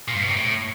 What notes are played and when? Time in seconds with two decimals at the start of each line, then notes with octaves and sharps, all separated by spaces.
0.08 A#2
0.15 G2
0.22 B2
0.29 C3
0.36 A2